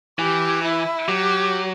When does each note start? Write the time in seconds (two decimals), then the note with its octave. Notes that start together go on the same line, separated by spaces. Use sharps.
0.19 E3 G4
0.63 E4
1.08 F#3 G4